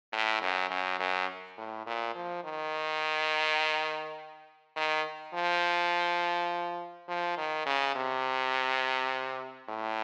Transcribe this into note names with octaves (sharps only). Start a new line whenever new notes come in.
A2
F#2
F#2
F#2
A2
A#2
F3
D#3
D#3
F3
F3
D#3
C#3
C3
A2